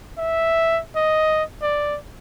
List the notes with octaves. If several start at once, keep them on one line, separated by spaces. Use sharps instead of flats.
E5
D#5
D5